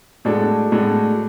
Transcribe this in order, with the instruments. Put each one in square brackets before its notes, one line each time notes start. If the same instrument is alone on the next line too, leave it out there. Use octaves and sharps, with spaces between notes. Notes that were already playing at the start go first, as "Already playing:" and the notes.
[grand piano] A2 G#3 D4 F#4 A4
A2 G#3 D4 F#4 A4